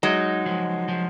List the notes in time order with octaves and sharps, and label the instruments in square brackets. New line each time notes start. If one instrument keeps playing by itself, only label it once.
[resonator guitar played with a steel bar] F#3 G#3 [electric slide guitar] D#4
[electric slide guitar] F3
F3